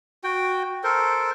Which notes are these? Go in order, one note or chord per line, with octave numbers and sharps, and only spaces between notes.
F#4 G5
A4 A#4 C5